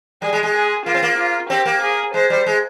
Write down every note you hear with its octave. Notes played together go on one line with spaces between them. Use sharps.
G3 G#4
G#3
G#3
G#4
A#3 F4
C4
A#3
F4
C4 G4
A#3
G#4
G#3 C5
G3
G#3